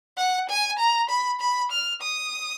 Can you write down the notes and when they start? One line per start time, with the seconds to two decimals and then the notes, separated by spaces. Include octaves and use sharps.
0.17 F#5
0.49 G#5
0.78 A#5
1.09 B5
1.41 B5
1.71 F6
2.02 D#6